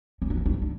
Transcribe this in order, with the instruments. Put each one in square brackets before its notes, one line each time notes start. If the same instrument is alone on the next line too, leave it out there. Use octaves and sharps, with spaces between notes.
[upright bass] C#4
D4
C#4
D4
C#4
D4